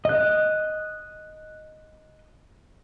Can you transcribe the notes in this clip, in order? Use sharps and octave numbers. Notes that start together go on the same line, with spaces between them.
D#5 F#6